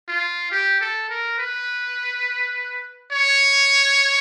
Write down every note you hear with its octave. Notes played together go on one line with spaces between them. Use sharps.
F4
G4
A4
A#4
B4
C#5